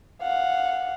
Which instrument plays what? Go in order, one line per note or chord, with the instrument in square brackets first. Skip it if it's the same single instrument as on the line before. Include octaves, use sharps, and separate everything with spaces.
[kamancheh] F5 F#5